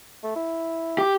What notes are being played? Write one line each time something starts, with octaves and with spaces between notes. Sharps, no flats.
A3
E4
G4